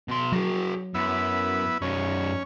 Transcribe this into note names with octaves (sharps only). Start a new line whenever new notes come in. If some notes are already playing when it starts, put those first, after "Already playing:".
B2 C6
F#3 F#4 G#4
F#2 B3 E4
F#2 C#4 D#4